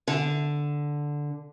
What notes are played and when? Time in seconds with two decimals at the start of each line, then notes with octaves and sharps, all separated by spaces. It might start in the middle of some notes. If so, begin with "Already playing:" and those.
0.08 D3